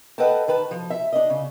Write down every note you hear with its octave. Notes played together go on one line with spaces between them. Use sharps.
A4 B4 D#5 F#5 G5 A5
D#3 B4 A5
F3
E5
D4 D#5
C#3